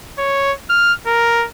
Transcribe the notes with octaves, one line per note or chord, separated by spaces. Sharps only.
C#5
F6
A#4